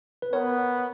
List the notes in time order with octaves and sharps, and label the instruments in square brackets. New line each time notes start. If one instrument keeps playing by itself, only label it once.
[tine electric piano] B4
[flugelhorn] B3 [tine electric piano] A#4 C#5